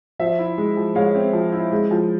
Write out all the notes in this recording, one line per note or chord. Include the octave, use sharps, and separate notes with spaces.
F3 C5 E5
E4
G#3
F3
G#3 C#5 F5
C4
F3
E4
G#3
F3